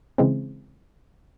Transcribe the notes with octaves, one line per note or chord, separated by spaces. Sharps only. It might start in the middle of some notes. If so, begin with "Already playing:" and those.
C#3 E3 G#3 C4